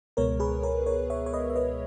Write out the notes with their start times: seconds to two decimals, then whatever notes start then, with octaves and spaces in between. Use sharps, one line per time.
0.17 C#2 B2 G#3 B3 A#4 C#5
0.40 G#4 B4
0.63 A#4 C#5
0.86 A#4 C#5
1.10 C#5 E5
1.26 C#5
1.33 B4 D#5
1.50 E5
1.56 B4 D#5